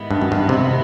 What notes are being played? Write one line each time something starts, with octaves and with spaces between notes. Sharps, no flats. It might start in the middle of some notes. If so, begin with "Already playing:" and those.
Already playing: G#2 D#3 G3 B3 E4
G2
F#2
G2
C3